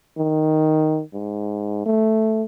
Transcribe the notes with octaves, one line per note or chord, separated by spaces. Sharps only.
D#3
G#2
A3